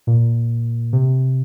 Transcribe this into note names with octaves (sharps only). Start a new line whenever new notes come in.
A#2
C3